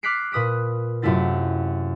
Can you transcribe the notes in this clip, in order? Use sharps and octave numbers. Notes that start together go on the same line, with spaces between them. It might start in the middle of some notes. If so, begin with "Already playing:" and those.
D6 F6 F#6 B6 C7 D7
A#2 B4 D#6 B6 D7
F#2 C3 A3 E4 F4 A6